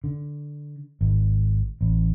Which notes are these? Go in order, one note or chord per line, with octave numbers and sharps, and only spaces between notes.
D3
G#1
A1